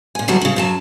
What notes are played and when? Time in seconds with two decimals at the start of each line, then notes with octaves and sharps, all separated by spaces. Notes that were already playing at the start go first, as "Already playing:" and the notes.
0.15 A#2 G#5
0.28 D2 E3 F#3 G3 A5
0.41 C#3 C#4
0.56 F#2 F#3 A5